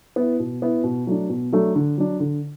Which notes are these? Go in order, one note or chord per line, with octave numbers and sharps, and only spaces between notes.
B3 E4
B2
B3 E4
B2
F#3 A3 D4
B2
F#3 A3 D4
D3
F#3 D4
D3